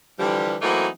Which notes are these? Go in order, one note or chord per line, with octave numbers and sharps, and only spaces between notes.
D3 E3 F3 G3
E3 F#3 A3 A#3 C4 D#4